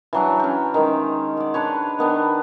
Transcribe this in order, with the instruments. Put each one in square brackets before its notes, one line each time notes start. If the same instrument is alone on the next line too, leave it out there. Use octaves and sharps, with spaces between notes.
[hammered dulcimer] E3 F#3 D4
C#4 G5
D#3 G#3
D5 F#5
D4 B4 C#5
D#3 B3 D4